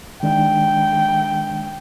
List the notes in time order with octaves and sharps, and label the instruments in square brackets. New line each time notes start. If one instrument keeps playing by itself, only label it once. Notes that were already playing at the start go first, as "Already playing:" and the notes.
[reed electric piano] D#3 G#3 D4 [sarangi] G5